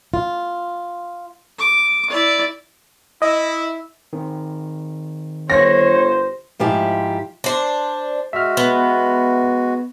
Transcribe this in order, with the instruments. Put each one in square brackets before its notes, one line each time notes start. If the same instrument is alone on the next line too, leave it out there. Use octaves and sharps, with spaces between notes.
[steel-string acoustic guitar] F4
[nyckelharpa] D6
E4 D5
[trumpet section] E4 [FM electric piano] D#5
[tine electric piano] D#3 C4
[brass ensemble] G1 C5 [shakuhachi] C#5 [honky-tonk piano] A#6
[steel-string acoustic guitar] G#2 F3 E4 G4
[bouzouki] D4 C5
[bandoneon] G#3 F#4 [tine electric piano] E5 F6
[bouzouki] B3